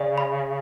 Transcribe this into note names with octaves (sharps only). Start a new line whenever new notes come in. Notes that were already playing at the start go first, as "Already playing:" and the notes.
Already playing: C#3 D5
B5